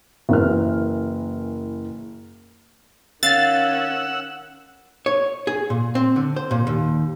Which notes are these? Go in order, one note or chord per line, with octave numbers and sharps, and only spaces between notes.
F#1 E3 A#4 F6
D#3 C#4 F5 F#5 E6 A6
C#5
G#4
A#2
C4
D3
C5
A#2
D#2